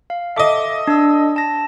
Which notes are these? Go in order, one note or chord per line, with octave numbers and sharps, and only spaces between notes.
F5
A4 D#5 E5 D6
D4 E6
A5 A#6